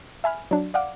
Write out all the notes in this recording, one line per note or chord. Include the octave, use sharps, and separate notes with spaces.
E5 G#5 B5 F6
F#3 D4
D5 F5 F#5 D6